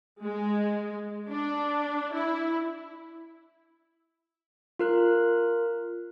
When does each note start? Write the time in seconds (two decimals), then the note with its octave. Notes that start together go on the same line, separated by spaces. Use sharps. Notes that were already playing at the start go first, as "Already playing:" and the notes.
0.23 G#3
1.29 D4
2.13 E4
4.79 F4 A#4 F#6